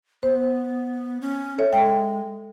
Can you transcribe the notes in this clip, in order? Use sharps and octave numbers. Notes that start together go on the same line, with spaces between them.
B3 C5
C#4
A4 C#5 E5
G#3 G5